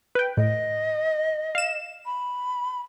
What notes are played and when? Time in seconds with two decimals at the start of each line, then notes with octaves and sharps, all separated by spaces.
0.15 B4 G5
0.37 A2 D#5
1.55 F5 E7
2.06 B5